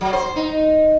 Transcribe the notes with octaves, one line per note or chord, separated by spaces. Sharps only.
F#3
C5
D#4